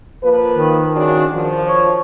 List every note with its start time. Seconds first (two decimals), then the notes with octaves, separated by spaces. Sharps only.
0.23 F3 A#3 B4
0.56 D#3
0.95 C#3 D4 F#4
1.34 F3
1.68 C#5